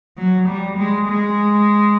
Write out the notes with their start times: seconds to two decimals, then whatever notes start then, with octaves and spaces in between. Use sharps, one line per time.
0.17 F#3
0.47 G3
0.77 G#3
1.07 G#3